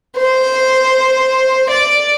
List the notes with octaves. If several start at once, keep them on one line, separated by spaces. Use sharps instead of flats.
C5
D5